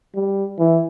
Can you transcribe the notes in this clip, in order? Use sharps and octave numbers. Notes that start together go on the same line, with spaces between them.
G3
E3